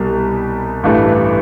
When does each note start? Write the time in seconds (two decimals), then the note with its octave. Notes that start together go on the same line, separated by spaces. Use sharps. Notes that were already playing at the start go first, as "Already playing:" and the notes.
Already playing: C2 B2 G3
0.83 A1 G2 E3 A3